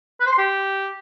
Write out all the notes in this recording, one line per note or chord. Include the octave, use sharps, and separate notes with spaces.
B4
C5
C6
G4